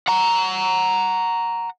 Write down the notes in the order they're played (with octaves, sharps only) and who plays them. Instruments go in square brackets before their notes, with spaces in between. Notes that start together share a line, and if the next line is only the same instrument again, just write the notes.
[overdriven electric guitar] F#5 A#5